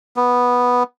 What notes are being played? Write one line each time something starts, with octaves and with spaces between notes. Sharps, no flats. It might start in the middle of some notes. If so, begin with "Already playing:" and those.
B3